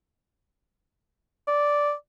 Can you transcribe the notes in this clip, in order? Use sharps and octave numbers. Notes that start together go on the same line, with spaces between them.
D5